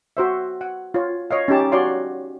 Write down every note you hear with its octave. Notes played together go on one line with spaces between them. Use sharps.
F#4 C5 E5
F#5
F4 C#5
C#5 D#5 F5
C#4 D#4 G4 A5
F#4 C#5 D5 F5 C6